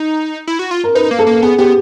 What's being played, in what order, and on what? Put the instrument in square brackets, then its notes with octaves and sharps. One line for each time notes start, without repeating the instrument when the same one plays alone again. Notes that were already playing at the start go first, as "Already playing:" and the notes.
Already playing: [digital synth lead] D#4
E4
F#4
F4
[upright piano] A#4
[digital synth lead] D#4 [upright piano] B4
[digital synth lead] A#3
[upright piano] A4
[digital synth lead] A#3
[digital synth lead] B3 [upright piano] G#4
[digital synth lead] B3 [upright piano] G4